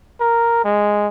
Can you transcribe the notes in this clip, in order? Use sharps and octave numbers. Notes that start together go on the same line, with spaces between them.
A#4
G#3